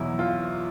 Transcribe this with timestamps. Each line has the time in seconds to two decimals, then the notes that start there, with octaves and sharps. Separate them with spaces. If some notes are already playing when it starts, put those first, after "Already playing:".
Already playing: E2 B2 F#3 E4
0.19 F4